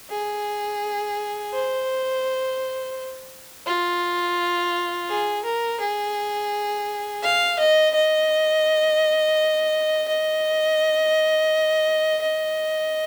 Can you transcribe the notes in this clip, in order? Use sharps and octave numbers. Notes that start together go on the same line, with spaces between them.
G#4
C5
F4
G#4
A#4
G#4
F5
D#5
D#5
D#5
D#5